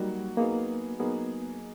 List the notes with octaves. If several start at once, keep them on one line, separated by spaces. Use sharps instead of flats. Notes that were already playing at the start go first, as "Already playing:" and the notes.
Already playing: F#3 G3 A#3 D#4 F#4
F#3 A#3 B3 D#4 G#4
F#3 A#3 B3 D#4 G#4